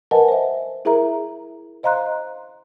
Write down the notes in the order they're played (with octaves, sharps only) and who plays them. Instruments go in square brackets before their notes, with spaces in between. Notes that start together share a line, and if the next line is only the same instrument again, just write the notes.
[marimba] A#4 B4 D#5 F#5 G#5 A5
C5 E5
E4 G#4 A#4 E5 A#5
C5 D#5 F5 A#5 C6 F#6